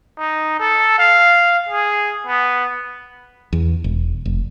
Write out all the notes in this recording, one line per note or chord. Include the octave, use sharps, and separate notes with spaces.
D#4
A4
F5
G#4
B3
E2
E1
F1